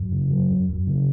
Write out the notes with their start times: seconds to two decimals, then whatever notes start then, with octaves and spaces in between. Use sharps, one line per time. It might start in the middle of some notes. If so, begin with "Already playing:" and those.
Already playing: F#2
0.12 C#3
0.31 F#3
0.50 F#2
0.69 F#2
0.87 C#3